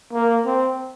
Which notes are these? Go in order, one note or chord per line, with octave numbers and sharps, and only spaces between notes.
A#3
C4